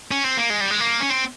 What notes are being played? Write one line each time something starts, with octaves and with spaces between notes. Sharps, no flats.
C#4
C4
A#3
G#3
G3
G#3
A#3
C#4
C4